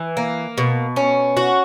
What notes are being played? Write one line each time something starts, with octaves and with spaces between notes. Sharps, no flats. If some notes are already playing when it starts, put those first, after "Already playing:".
Already playing: E3
A#3
B2
C#4
F#4